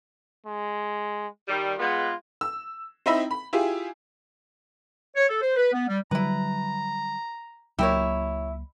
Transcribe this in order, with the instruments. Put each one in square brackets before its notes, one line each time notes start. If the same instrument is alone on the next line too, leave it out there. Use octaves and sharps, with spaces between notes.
[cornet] G#3
[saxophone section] D#3 G3
[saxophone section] G#3 B3 [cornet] F4
[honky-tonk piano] E6
C4 D#4 E4 E5 B5
B5
E4 F4 G4 G#4
[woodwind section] C#5
A4
C5
B4
B3
G3
[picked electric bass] D3 F#3 G3 [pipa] E4 B4 [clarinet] A#5
[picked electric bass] C#2 F#3 A#3 [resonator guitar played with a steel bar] E4 [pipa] G4 A#4 C#5